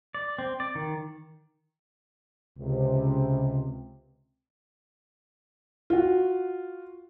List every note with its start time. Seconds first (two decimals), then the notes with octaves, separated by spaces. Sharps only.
0.15 D5
0.38 C4
0.60 D5
0.75 D#3
2.59 C#2 C3
5.90 F4 F#4